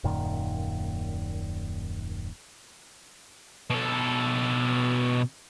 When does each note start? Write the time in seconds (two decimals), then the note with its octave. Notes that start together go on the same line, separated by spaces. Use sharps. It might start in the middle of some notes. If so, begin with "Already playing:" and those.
0.04 D#1 F#2 A#2 D#3
3.70 B2 A4